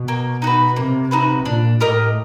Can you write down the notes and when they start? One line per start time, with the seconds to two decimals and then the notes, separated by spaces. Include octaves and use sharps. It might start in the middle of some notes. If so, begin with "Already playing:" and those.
Already playing: B2
0.08 A#3
0.42 D#4 F#4 B4
0.76 C3 A#3
1.11 D#4 F#4 B4
1.45 A#2 D4
1.80 A2 G4 A#4 D#5